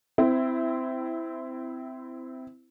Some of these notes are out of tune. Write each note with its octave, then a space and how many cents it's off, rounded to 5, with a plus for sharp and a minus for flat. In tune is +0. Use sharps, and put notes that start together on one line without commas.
C4 -20 E4 +0